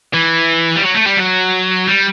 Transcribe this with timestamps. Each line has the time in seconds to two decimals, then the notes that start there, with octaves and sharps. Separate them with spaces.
0.14 E3
0.76 G3
0.83 F#3
0.95 A3
1.06 G3
1.17 F#3
1.87 G3